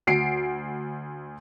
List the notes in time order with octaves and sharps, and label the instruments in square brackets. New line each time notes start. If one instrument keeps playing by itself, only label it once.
[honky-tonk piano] D2 C7 D7